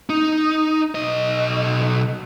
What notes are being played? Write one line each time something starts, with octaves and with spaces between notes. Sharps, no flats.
D#4
B1 D#5